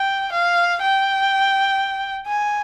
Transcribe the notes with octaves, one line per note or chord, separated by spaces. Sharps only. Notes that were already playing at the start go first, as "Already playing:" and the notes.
Already playing: G5
F5
G5
G#5